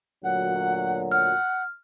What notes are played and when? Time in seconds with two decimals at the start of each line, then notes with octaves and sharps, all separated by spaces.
0.23 D2 A#2 F#3 F#5
1.11 F#5 F6